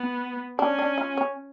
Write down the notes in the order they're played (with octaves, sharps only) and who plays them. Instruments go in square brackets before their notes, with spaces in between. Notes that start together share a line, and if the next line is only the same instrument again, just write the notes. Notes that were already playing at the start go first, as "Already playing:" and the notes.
Already playing: [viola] B3
[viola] C#4 [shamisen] D4
[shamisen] D4
F4
C#4